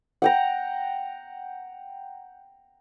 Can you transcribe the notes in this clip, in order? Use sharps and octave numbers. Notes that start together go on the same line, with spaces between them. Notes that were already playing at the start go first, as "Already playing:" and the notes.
F#5 G5 A#5